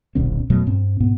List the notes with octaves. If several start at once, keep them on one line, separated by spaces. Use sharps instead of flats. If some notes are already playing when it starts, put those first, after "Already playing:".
D#1 B1 D3 C4
F2 B2 F#3 A3
G2 C4
G#2 B2 B3